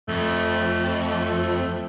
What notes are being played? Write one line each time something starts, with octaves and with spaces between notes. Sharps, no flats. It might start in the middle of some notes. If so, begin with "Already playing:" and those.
F2 A3